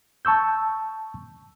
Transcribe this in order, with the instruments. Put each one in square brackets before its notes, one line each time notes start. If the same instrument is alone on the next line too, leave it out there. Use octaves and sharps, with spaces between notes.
[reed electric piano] A5 C#6 E6 G6